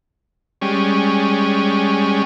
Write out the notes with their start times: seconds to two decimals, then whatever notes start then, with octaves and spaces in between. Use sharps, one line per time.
0.62 G3 G#3 C#4